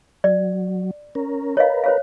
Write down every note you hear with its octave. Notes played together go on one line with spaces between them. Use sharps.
F#3 D5
C#4 A#4
A#4 B4 C#5 D#5 F5
C5 C#5 F5